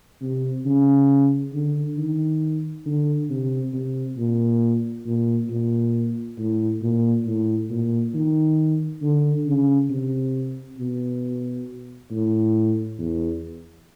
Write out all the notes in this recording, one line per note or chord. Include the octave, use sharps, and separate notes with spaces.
C3
C#3
D3
D#3
D3
C3
C3
A#2
A#2
A#2
A2
A#2
A2
A#2
D#3
D3
C#3
C3
B2
A2
E2